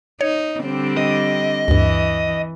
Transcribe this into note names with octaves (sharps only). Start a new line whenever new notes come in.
D#4 C#5
D3 G3 C4
D#5
D2 G2 E3